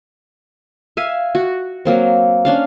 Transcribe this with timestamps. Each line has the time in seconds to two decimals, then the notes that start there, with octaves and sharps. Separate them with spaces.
0.97 E5 F5 G#5
1.35 F#4
1.85 F#3 A#3 C4
2.45 C#4 D4 F5